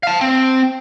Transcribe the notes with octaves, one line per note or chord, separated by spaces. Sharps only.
F5 A5
C4